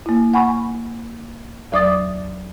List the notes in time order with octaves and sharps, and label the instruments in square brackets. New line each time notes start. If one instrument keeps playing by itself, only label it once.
[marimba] A#3 E4
F#5 G#5 B5 C#6
E2 F#3 D5 D6 D#6 A6